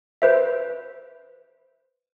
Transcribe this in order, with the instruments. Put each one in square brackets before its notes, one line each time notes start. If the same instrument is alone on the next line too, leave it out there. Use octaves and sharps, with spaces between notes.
[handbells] B4 C5 E5